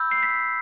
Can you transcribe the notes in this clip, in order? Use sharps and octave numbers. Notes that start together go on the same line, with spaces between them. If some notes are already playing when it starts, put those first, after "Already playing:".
Already playing: B5 E6 G6
C7
B6